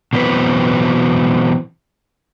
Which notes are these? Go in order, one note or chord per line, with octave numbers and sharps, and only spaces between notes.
B2 E3 F#3 C4 B4